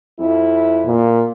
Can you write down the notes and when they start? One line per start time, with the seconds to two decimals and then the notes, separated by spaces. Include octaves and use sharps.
0.20 F2 E4
0.87 A#2